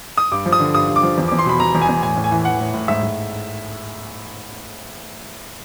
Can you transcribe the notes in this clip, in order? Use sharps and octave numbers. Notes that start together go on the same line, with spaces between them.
D#6
G2 D6
F3
D#6
D3
G2 D#6
G2
D6
F3
E2
E2 D6
C6
B2 B5
B2 A#5
E2
G#5
E2
A2 G#5
A2
G#5
E3
E3 F#5
A2
A2
G#2 E5
G#2